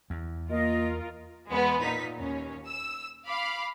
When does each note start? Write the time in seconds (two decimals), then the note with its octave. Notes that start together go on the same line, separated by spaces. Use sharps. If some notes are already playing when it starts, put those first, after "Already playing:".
0.10 E2
0.50 A#3 F4 A#4 D#5
1.50 E2 G#3 B3
1.80 A#2 D#4 B6
2.17 D#2 C#4
2.67 E6
3.27 F5 B5 D6